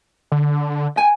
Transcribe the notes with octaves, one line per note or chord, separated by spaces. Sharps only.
D3
G5 G#5